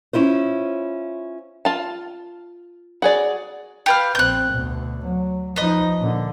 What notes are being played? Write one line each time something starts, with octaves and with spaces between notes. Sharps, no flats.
C#4 E4 F4 C5
F4 A5
F#4 G#4 D5
G4 B4 F5
A#1 C4 F#6 G6
D2 B2
F#3
F3 D#4 B4 D#5
A#2 D3